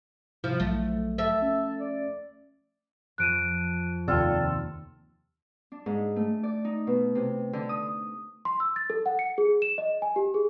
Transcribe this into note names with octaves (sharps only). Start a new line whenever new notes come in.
C3 F3 E4
A#1 F#3 A3
A4 E5
C#4
D5
F2 F3 F#6 D7 D#7
D#2 C3 F4 A4 D5 G5
D4
G#2
A3
D5
D#4
B2
C3
D3
D#6
C6
E6
A6
A4
F#5
C#7
G#4
E7
D#5
G#5
G4
G#4